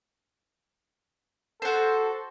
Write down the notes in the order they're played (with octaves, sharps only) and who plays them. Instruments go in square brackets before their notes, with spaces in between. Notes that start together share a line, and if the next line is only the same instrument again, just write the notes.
[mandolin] F#4 C5 [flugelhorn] A4